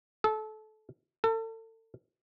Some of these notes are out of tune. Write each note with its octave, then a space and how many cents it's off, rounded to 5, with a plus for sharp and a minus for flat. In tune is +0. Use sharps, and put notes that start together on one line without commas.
A4 -25
A4 +35